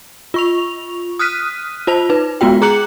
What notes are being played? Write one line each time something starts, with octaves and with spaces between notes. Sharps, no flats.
F4 C#6 F7
D#6 F6 F#6 B6 D#7
F4 C5 A5 F7
D#4 B4
G#3 B3 F4 F#4 G5
G#4 A#5 D6 F#6 C#7 F#7